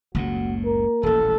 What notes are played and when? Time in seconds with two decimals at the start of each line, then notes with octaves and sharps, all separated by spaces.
0.15 F#1 C#2 A2 A#3 F#4
0.65 A#4
1.03 D#1 A1 A4